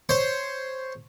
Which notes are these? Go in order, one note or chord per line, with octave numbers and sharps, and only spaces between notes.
C5 C#5